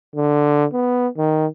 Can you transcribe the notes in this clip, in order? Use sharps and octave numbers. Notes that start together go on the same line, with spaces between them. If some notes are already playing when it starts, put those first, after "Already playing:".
D3
B3
D#3